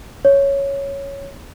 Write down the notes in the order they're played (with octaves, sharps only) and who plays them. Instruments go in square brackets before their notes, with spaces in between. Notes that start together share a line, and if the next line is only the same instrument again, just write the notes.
[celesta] C#5